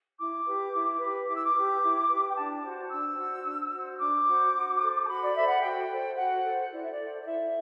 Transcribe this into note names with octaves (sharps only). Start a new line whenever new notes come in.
E4 D6
G4 B4
E4
G4 B4
E4 D6
E6
D6
G4 B4
E4
G4 B4
G5
D4 A5
F#4 C5
D4 E6
F#4 C5
D4
F#4 C5
D4 D6
F#4 C5
F#4
A4 C5
A5
F#4 B5
D5
A4 C5 E5
F#5
F#4 G5
A4 C5
F#4 F#5
A4 C5
E4 D5
E5
D5
A4 C5
D5
E4 E5